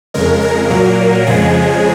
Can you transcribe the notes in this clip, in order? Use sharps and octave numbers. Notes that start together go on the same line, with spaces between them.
F2 C#3 G#3 A#4
A#4
A#2 F#3 A#3
F2 C#3 F3 G#3 G#4